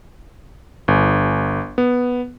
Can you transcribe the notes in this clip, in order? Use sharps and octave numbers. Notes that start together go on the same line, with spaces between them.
G1
B3